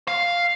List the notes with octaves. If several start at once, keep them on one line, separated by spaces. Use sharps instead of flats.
F5